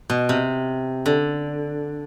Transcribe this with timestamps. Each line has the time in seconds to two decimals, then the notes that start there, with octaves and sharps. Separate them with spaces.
0.10 B2
0.29 C3
1.06 D3